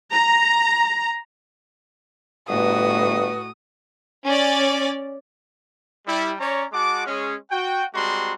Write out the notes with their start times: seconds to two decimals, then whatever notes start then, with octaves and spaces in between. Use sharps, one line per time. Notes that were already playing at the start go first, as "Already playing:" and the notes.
0.13 A#5
2.49 G1 A2 F#4 B4 D#6
4.26 C#4 D5
6.07 G3 E4
6.40 C#4 C#5 D5 A#5
6.72 G#3 F#4 F#5 A5 D6
7.06 G#3 C#4
7.51 F#4 G5
7.94 G3 G#3 C4 F#4 A#5 C6